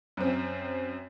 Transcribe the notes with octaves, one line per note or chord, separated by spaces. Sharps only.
F#2 C4